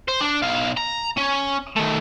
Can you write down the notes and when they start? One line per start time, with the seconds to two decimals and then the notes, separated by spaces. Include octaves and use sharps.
0.08 C5
0.20 D4 D5
0.42 B1 F5
0.77 A#5
1.18 C#4
1.77 D#3 A3